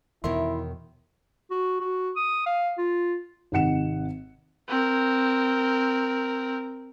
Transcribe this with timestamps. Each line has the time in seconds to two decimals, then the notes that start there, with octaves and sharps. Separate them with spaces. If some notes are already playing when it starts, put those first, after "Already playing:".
0.24 E2 B2 D#3 E4 A#4 C#5 E5 C6
1.51 F#4
1.80 F#4
2.16 D#6
2.46 F5
2.78 F4
3.52 G#1 C3 D#4 F#5 C#7 E7
4.68 C4 A#4